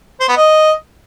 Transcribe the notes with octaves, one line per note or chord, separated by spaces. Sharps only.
C5
B3
D#5